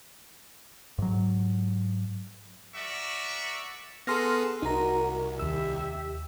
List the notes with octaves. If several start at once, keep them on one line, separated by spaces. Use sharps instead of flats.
G#2 F#3
F#4 A#4 D5 E5 C#6
B3 G#4 A4 C6 F6 A#6
C2 D#4 F#4 A#4 A#5
D#2 G4 E5 E6